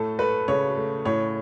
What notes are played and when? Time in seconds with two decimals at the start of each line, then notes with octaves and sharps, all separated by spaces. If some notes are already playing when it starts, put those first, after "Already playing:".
Already playing: A2 A3 A4
0.19 A3 B4
0.48 C#3 C#5
0.76 A3
1.05 A2 C#5